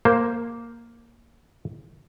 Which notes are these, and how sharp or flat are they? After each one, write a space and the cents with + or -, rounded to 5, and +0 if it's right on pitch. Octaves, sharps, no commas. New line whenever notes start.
A#3 +0 C5 +0